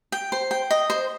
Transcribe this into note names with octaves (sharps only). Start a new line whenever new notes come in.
G5
C5
G5
D#5
C5